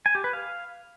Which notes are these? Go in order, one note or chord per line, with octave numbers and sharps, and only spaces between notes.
G#5
G4
B4
F5